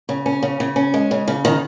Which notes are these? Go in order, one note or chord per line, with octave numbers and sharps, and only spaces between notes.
C#3
C#4
C#3
C#3
C#4
G#3
C#3
C#3
D#3